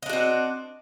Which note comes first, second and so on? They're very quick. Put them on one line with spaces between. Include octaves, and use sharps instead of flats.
D#5 D4 F#4 C4